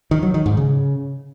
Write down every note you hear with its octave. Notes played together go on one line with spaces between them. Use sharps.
D#3
F#3
D#3
G#2
C#3